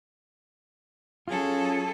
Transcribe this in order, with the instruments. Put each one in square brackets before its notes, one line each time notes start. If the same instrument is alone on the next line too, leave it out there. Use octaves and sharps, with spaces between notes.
[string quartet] F#3 G#4 A4 [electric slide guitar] C#4 F4